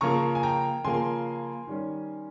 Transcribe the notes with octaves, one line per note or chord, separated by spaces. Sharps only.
C#3 F3 A#3 A#5 C#6
G#5
G5 A#5
C#3 F3 A#3 G#5 C6
D#3 G3 C#4